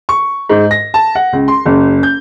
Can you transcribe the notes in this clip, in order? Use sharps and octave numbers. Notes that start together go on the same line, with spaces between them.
C#6
G#2
A#6
A5
F#5
C#2
C6
F#1
G6